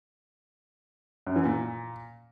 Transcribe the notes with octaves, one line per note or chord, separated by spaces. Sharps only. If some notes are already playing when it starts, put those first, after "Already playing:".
F#2
E3
A#2